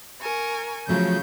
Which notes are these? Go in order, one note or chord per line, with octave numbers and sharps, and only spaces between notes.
A#4 G#5 C#6
C#3 F3 F#3 A3 G6